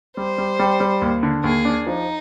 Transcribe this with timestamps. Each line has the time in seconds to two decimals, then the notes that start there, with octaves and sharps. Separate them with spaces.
0.17 G3 C5
0.38 G3
0.59 G3
0.80 G3
1.02 D#2
1.23 D3
1.44 D#2 G#4
1.65 D4
1.86 F3 D#4